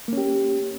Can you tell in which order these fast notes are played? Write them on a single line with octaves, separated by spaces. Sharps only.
A#3 C#4 G4